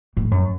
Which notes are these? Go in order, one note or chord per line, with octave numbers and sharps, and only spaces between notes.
A2
F#2